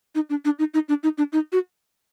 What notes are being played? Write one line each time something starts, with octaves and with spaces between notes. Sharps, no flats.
D#4
D4
D4
D#4
D#4
D4
D#4
D4
D#4
F#4